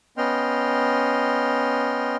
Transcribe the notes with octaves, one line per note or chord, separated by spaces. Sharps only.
B3 C#4 D#5 G5 C6 F6